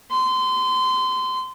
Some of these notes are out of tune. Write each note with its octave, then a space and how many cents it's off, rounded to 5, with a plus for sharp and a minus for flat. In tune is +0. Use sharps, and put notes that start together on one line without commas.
C6 -25